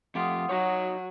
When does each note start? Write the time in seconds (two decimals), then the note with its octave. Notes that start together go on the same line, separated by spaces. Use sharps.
0.15 F2 A3 F4 G4 F#5 D#6
0.49 F#3 D#4 F#4 C#5